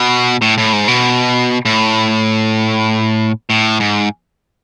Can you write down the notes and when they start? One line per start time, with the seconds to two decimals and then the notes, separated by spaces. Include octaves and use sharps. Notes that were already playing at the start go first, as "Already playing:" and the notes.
Already playing: B2
0.42 A2
0.58 A2
0.73 G#2
0.88 B2
1.65 A2
3.50 A2
3.80 G#2